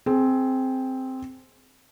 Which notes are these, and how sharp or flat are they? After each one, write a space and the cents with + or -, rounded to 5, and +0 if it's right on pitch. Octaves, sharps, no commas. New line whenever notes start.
C4 +0 G#4 +20